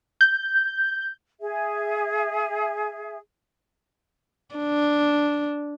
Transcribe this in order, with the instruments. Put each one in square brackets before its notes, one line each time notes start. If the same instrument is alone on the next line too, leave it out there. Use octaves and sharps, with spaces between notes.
[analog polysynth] G6
[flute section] G#4 E5
[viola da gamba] D4